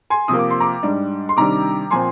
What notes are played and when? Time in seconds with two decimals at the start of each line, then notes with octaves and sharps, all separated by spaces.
0.10 G#5 C6
0.28 C3 F3 A#3 D#6
0.39 D6
0.51 C6
0.60 A#5 D6
0.83 G#2 G3 D4
1.29 C6
1.37 C3 D#3 G3 D4 A#5 D6
1.91 A#2 F3 C4 G#5 C6